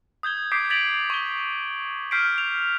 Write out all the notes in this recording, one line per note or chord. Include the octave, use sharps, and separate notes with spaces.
D#6 G6 G#6 G7
D6 D#6 G6 B6 C7 D7
G#6 A6 B6 D7 F7 F#7
C#6 G7
C#6 F6 G6 B6 C7 D7
F7